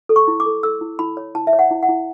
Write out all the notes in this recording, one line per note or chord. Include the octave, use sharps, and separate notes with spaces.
A4
C#6
E4
D6
A4
A4 E6
E4
E4 B5
C#5
E4 A5
E5
C#5
F#5
E4
F#5
E4